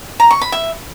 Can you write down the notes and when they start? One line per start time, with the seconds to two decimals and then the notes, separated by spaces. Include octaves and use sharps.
0.20 A#5
0.31 C#6
0.41 B5
0.52 E5